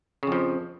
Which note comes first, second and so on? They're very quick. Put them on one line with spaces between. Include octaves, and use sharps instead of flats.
C#3 F2 F3